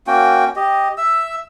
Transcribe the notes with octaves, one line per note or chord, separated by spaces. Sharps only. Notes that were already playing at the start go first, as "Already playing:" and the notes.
A#3 C#4 F#4 G5
G4 D#5
E5 E6